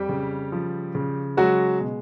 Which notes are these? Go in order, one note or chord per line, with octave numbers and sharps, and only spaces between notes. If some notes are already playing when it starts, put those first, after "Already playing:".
Already playing: F2 G3 G4
C#3
F3
C#3
F#3 G#3 F#4
B2